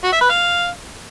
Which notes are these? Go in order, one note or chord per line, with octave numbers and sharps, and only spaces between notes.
F#4
E5
B4
F5